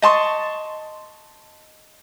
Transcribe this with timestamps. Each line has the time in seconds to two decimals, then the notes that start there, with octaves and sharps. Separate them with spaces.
0.02 D#5 A5 C6 C#6